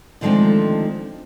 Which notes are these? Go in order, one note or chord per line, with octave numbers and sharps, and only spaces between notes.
D3 D#3 F3 G#3 A3 C4